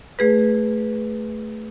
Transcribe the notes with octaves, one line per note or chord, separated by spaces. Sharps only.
A3 G#4 B4